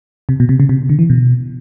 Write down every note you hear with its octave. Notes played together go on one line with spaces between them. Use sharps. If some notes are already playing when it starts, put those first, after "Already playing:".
C3
B2
C3
C#3
C3
D3
E3
B2